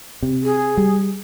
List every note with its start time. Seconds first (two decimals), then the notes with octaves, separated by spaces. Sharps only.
0.22 C3
0.43 G#4
0.77 G3